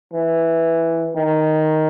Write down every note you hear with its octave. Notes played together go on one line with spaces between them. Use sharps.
E3
D#3